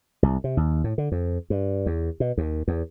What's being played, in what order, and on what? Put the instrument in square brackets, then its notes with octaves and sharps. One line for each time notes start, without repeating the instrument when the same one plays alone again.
[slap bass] C2
C3
D#2
A2
D3
F2
G2
E2
B2
D#2
E2